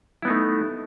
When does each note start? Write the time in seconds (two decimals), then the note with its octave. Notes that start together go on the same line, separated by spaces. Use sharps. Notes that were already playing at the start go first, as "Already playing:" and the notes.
0.22 E4
0.25 B3
0.28 D#4
0.30 A3